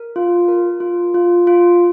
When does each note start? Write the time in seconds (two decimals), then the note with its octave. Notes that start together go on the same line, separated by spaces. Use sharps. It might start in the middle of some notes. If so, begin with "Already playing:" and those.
Already playing: A#4
0.16 F4
0.48 A#4
0.80 F4
1.14 F4
1.47 F4